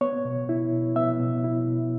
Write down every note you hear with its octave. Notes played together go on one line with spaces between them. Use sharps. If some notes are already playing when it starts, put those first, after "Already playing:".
B3 C#5
B2
E4
B2
B3 E5
B2
E4
B2